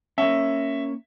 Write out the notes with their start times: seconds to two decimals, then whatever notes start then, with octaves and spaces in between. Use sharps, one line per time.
0.18 A#3 C#4 E5